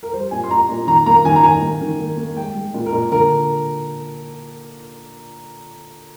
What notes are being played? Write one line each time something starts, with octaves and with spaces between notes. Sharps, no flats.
A#4
G3 C5
A#2 G#5
C6
A#2 A#5
A#2
D#3 A#5
A#3 A#5
D#3 G#5
A#5
D#3 G#5
A#3
D#3
A#3
A#3
G#3 G5
G#3
A#2
A#4
A#2
D3 A#4